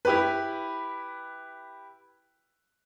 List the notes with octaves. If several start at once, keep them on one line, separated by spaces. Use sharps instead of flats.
E4 G4 B4